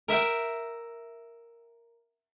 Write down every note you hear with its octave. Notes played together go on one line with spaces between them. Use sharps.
A#4 E5 F#5 G5